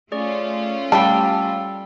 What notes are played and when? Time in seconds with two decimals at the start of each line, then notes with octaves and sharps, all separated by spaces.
0.12 A3 C#4 F4 G#4 D5 C#6
0.92 G3 D5 F5 G5 A5 E6